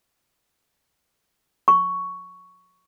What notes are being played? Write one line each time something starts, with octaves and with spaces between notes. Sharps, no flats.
C#6